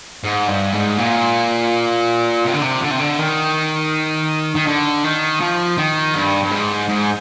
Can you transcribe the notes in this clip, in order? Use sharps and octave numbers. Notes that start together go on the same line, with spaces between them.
G#2
G2
G#2
A#2
C3
D3
C3
D3
C3
D3
D#3
D#3
D3
D#3
F3
D#3
G2
G2
G#2
G#2